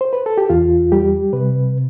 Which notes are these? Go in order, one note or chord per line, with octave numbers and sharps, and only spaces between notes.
C5
B4
A4
G4
E2 F4
G3 G4
C3 B4